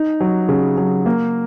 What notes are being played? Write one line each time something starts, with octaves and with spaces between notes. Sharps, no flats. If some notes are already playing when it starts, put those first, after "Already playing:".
Already playing: D#4
F#3
C#3
F#3
A#3